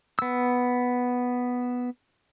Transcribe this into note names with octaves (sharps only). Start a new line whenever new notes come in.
B3 E6